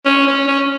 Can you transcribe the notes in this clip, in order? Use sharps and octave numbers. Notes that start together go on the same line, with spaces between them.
C#4
C#4
C#4